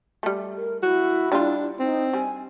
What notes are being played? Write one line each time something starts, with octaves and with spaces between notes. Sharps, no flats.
G3 A3
A#4
E4 F#4
G3 D4 F4
C4 D#4
G3 G#5